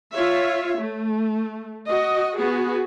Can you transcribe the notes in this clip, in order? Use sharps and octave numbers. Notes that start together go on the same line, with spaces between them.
F4 C#5 E5
A3
F#4 D#5
B3 F#4 G#4